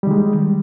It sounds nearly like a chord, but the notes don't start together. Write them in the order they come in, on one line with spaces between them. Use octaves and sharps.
G3 D#3 G#3